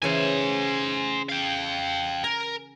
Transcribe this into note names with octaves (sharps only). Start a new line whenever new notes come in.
C#3 E3 C5 G#5
F5 G5
A#4 G#5